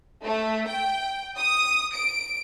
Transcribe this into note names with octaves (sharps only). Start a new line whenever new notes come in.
A3
G5
D#6
D7